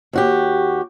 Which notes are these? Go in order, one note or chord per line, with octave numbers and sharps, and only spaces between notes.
D#2 F#4 G4